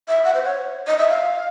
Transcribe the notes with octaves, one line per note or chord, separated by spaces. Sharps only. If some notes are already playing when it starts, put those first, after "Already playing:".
E5
F#5
C5
C#5
D#5
E5
F5